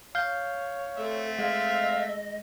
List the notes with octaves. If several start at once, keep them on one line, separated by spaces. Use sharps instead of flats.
C#5 F5 G6
A3 C4 A4 E5
G#3 D#5 F5